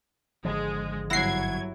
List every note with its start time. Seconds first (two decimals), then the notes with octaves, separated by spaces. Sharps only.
0.45 G#1 D3 F3 G#3
1.10 G1 F#3 E4 F#5 G#6 A#6 C7